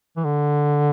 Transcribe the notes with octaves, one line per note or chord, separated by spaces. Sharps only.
E3
D3